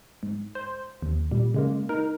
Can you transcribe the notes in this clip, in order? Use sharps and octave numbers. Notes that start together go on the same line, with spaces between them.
G#2
C5
D#2
A#2 G3
C#3 G#3 A#3
D#4 A#4